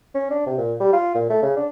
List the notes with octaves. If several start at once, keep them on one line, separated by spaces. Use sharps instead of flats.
C#4
D4
C3
A#2
G3
F4
A#2
A3
C#3
D4